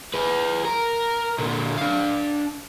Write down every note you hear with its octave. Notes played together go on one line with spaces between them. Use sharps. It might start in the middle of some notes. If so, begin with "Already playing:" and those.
G#4 B4
A#4
A#2 D3
D4 F5